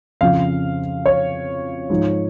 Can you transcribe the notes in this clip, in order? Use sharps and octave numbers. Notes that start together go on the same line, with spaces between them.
F2 C#3 F3 F5
C#5
G#2 F3